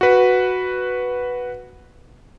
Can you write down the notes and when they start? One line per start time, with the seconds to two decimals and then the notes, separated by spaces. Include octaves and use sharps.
0.01 F#4 B4